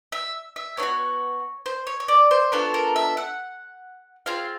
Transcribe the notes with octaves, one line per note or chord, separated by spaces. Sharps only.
E5
E5
B3 D4 C#5
F#4
C5
C#5
C#5
D5
C5
B3 D4 F4 A4 C#5
A#4
E5
F#5
C4 F4 G#4 F5